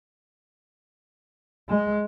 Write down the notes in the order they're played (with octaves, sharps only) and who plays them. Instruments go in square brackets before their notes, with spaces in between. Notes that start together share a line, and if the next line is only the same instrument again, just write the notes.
[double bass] G#3